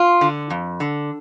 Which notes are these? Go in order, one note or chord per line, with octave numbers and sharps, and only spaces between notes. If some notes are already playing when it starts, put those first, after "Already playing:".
Already playing: F4
D3
F2
D3